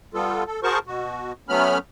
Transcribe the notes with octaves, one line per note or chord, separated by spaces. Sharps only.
G3 B3 F4 A4
A4
F#4 G#4 A#4 C5 A5 C#6
B2 F#4
F#3 A3 B3 C#4 B5 F6